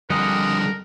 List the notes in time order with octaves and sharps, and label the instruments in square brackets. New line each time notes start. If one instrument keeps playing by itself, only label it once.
[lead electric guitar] F2 D3 [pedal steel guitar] G3 D#5 F#5 [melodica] G#4 [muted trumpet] A#4